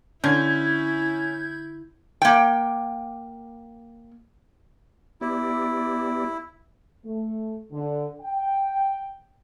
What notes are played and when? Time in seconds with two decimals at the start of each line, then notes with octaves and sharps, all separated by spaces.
0.24 D3 C#4 E4 G6 G#6
2.22 A#3 G5
5.21 B3 E4 G4 D5
7.05 A3
7.72 D3
8.21 G5